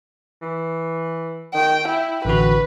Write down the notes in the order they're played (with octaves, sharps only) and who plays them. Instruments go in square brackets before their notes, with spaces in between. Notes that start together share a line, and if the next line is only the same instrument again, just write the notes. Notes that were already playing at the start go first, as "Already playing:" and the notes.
[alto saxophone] E3
[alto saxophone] D#3 [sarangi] G5
[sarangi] E4 [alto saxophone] G5
[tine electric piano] A1 D3 F#4 [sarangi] B4